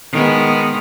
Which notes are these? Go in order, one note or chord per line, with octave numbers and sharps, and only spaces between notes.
D#3 G#3 B3